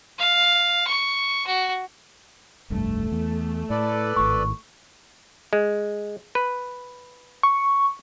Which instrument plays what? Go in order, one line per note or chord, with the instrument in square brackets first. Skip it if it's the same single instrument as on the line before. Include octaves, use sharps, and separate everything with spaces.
[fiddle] F5
C#6
F#4
[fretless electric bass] F1 C2 G2 [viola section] A3
[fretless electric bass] E2
[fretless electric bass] A2 [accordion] A4 B4 D5
[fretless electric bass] G#1 A2 [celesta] C#6
[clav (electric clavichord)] G#3
B4
[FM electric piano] C#6